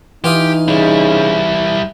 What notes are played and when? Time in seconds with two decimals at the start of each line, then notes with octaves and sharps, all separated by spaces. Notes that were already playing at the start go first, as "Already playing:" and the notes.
0.24 E3 D#4 F4 G4 D#6
0.68 C#3 G3 E4